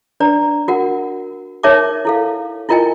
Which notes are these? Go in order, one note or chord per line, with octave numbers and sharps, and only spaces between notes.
D4 B4 D5 A#5
F#4 A#4 F#5
D#4 A#4 C#5 E5 A5 D6
E4 A4 F5
E4 F4 A#4 D#5 G5 G#5